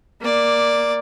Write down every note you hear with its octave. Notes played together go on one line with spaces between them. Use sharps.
A#3 D5